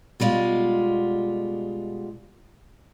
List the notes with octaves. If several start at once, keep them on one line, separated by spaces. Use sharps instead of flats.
B2 G3 G#3 F4